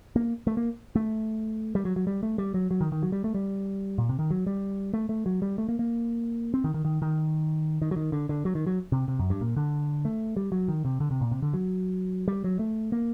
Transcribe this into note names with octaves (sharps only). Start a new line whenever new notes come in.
A#3
A3
A#3
A3
G3
F#3
F#3
G3
A3
G3
F#3
F#3
D#3
D#3
F#3
G3
A3
G3
A#2
C3
D#3
F#3
G3
A3
A3
F#3
G3
A3
A#3
A#3
C4
D#3
D#3
D#3
D#3
D#3
F#3
D#3
D3
D3
F#3
D#3
F#3
C3
C3
F#2
G2
A#2
D3
A3
G3
F#3
D#3
C3
D3
C3
A#2
C3
D3
F#3
G3
F#3
A3
A#3